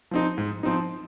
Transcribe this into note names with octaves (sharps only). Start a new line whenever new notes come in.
F3 C4 D#4
G#2
F3 C4 D#4